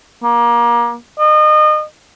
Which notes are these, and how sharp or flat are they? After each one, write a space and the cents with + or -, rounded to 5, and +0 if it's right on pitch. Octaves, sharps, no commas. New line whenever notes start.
A#3 +25
D#5 -30